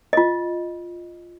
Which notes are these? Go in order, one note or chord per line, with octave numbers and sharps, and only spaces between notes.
F4 D#5